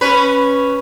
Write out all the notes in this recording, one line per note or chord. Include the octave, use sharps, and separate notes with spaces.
C#4 B4